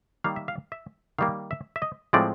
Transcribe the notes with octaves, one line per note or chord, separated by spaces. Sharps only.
D#3 G3 A#3 F5
E5
F5
E5
D#3 G3 A#3 F5
E5
E5
D#5
A2 F3 G#3 C4 D5